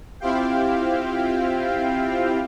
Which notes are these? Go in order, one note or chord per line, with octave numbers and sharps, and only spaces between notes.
C4 E4 F4 G4 F5 G5